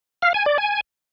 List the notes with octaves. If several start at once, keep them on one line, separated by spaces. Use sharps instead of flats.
F5
G#5
D5
G#5